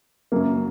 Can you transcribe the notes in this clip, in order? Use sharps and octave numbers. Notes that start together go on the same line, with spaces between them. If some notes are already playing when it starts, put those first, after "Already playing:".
F#2 C#3 F#3 A#3